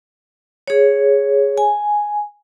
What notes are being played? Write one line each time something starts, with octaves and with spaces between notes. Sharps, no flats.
G#4 C#5
G#5